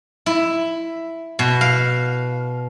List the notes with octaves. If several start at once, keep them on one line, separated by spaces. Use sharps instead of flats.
E4
B2
F5